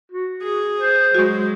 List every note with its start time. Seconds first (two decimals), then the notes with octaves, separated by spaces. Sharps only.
0.12 F#4
0.41 G#4
0.77 C5
1.15 F#3 G#3 F#4 C#6